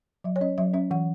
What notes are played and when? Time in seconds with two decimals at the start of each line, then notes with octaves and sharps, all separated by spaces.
0.24 F#3 E5
0.36 C#5
0.41 C#4 D#5
0.58 F#3 E5
0.74 C#4 E5
0.91 E3 F#5